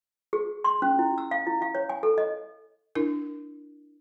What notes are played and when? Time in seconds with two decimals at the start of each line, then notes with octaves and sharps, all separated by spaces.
0.33 G#4
0.64 C6
0.82 C#4
0.99 E4
1.18 E6
1.31 F5
1.47 E4
1.62 F5
1.75 C#5
1.89 G#5
2.03 A4
2.18 D#5
2.95 D4 E4 A#4